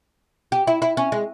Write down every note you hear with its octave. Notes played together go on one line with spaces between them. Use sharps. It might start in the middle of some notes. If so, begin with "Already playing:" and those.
G4
E4
E4
C#4
G#3